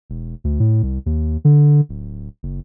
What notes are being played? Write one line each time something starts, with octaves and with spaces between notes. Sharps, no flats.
E1
D2
A2
C2
D#2
D3
D1
F#1